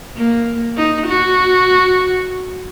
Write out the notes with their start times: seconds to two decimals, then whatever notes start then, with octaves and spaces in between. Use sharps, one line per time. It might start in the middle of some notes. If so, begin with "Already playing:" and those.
0.17 A#3
0.77 D#4
1.07 F#4